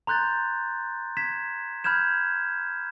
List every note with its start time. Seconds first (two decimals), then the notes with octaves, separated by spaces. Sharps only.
0.07 A#5 C6 F#6 G6 A6
1.17 G#6 B6 E7
1.84 B5 F6 G6 G#6 E7